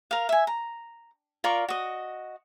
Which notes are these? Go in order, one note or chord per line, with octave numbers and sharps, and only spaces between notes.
A#4 F5
E5 G#5
A#5
F4 A#4 D5 C#6
F#4 D#5